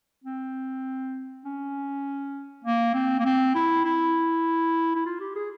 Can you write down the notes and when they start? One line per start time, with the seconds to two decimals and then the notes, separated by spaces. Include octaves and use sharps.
0.24 C4
1.45 C#4
2.64 A#3
2.94 C4
3.19 A#3
3.25 C4
3.55 E4
3.85 E4
4.95 E4
5.06 F4
5.20 G4
5.36 G#4